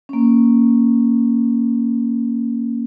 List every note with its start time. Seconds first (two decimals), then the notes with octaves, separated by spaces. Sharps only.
0.09 A#3 C#4